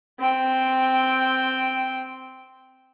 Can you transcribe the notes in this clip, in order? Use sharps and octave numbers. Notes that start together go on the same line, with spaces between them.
C4 G5